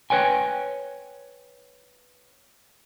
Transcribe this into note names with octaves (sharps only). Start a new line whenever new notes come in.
B4 C#5 G5 G#5